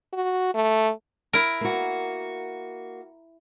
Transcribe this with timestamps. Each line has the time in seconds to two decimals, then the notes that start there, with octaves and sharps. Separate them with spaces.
0.13 F#4
0.55 A3
1.33 E4 A#4
1.61 A#3 F#4